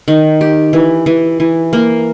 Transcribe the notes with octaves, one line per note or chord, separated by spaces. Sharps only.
D#3
G4
E3
E3
E3
A#3